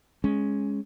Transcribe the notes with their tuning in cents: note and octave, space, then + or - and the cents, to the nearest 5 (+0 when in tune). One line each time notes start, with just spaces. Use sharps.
G#3 +0 C#4 +0